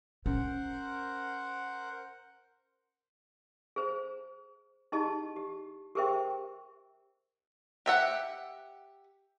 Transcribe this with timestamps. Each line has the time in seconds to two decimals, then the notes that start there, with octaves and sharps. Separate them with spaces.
0.26 C#4 A#4 C5 F#5
3.76 G#4 C5
4.92 D#4 E4 G4 G#4 D#5 A5
5.36 G4
5.95 G4 G#4 A#4 C5 E5 G5
7.86 G4 E5 F#5